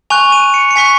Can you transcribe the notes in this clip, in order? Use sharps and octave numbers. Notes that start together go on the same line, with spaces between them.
G#5 C#6 F#6 F7
D#7
C#7
C#7
G#5 C#6 F#6 B6